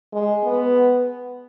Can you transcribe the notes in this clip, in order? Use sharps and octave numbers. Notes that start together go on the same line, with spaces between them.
G#3
B3